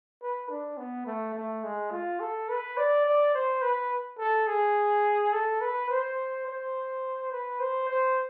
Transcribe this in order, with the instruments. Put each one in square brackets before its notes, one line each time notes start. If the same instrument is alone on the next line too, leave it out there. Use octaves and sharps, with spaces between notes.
[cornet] B4
D4
B3
A3
A3
G#3
F4
A4
B4
D5
D5
C5
B4
A4
G#4
A4
B4
C5
C5
B4
C5
C5